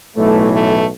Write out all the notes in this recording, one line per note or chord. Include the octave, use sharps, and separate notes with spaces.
B1 A2 E3 A3
A3